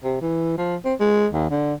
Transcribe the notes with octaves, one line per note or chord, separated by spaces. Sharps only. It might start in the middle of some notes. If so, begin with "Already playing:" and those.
C3
E3
F3
C4
G#3
D#2
D3